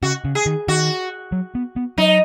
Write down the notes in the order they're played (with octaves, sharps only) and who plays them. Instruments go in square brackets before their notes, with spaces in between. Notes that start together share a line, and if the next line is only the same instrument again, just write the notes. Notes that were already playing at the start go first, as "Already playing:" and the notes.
[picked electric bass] C#3 [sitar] F#4
[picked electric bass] C#3
[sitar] G#4
[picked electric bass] D#3
[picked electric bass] D#3 [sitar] F#4
[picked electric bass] F#3
B3
B3
[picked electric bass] F#3 [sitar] D#4